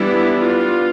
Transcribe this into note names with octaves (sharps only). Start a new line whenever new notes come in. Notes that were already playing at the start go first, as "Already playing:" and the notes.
Already playing: E3 G3 B3 D4 E4
F4